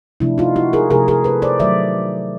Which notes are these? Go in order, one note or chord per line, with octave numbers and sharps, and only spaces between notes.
C3 F3 A3 D4 E4
D#4 F4
E4 F#4
G#4 A#4
C3 F3 A3 G#4 A#4
G#4 A#4
A4 B4
C5 D5
D#3 F#3 A3 D5 E5